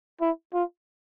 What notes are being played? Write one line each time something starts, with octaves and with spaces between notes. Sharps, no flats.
E4
F4